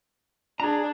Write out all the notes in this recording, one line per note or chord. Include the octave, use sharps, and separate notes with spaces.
D4 G#4 A#5